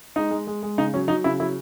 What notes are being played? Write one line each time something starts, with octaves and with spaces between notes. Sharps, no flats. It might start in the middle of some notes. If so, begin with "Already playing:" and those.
G#3 D#4
G#3
G#3
G#3
C#3 D#4
F#3 C#4
F#3 D#4
C#3 E4
F#3 E4